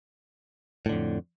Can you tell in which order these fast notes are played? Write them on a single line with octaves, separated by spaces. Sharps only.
A2 D3 F2